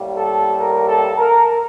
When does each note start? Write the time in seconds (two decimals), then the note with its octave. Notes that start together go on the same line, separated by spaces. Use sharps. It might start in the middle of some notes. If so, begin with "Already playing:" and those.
Already playing: A2 G3 A#3
0.17 A4
0.61 A#4
0.89 A4
1.18 A#4